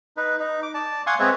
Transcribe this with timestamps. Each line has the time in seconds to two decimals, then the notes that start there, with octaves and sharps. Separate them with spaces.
0.17 D#4 B4
0.39 D#4
0.63 D6
0.74 D5 A5
1.07 F5 F#5 G#5 C6 C#6 D#6
1.19 G#3 B3 C4 B4 C#5 E5